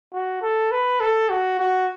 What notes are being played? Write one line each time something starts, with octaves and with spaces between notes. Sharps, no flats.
F#4
A4
B4
A4
F#4
F#4